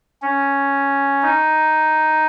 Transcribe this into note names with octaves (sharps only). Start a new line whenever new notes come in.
C#4
D#4